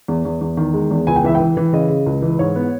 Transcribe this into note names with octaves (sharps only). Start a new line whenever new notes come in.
E2
E2
E2
D#3
G#3
E2
C#2 G#5
G5
E3 E5
G5
E3
E3
C#3 D#5
C#3
C#2
E3
G#2 C#5
B3